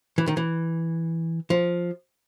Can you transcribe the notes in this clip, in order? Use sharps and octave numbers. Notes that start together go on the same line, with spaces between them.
E3
D#3
E3
F3